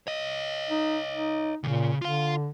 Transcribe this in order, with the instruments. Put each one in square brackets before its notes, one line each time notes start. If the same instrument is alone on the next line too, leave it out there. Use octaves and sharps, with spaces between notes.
[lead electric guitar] C#5 D#5
[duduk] D#4
D#4
[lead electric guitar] D2 C#3 [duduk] A#2
[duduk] D3 [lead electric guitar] F4 F5